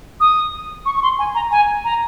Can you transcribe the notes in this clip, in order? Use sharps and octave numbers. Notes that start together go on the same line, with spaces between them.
D#6
C#6
C#6
C6
G#5
A#5
G#5
A#5